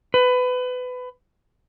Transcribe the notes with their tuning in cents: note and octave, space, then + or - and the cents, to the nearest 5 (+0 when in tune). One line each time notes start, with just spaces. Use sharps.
B4 +25